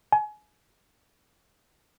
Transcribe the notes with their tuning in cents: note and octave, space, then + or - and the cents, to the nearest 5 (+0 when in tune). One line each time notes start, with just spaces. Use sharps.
G#5 +30